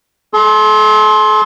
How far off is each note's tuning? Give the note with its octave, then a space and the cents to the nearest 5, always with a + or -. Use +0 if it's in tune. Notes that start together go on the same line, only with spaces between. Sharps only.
A4 -40 C6 +15